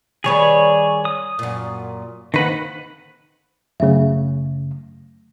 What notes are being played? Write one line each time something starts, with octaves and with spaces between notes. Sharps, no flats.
D#3 G3 G#4 B4 C#5
D#6
F#2 A#2
D#3 A#3 C4 B4 F#5
F#2 C#3 F#3 A3 E5